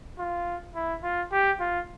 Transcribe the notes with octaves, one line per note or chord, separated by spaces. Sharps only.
F4
E4
F4
G4
F4